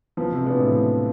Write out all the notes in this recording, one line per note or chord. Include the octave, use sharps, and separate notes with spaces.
F3 B3
C3
B2 G#3 B3 D4
A2
F3